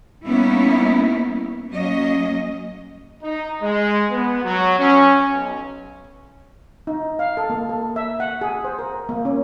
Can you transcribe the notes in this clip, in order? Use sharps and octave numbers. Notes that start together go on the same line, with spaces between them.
G3 A#3 B3 C#4 D#4 E4
F#3 A#3 C#4 D#5
D#4
G#3
B3
F#3
C#4
B1
D#4
F5
A4
A#3
A4
E5
F#5
G#4
C5
A#4
A#3
C#4